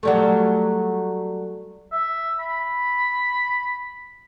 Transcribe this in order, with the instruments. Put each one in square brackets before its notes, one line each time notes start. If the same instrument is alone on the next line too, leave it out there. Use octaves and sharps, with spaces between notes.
[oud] F#3 G3 A3
[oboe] E5
B5